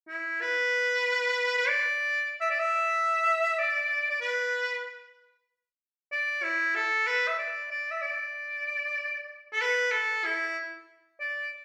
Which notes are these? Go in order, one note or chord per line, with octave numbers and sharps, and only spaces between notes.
E4
B4
B4
D5
E5
D5
E5
D5
D5
B4
D5
E4
A4
B4
E5
D5
D5
E5
D5
A4
B4
A4
E4
D5